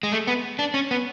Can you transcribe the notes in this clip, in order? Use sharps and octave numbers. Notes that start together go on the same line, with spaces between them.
G#3
A3
B3
D4
C#4
B3